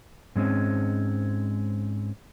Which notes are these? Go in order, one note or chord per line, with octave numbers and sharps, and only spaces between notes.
G#2 G#3 C4 C#4